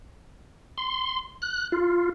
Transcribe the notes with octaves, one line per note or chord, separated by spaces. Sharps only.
C6
F#6
F4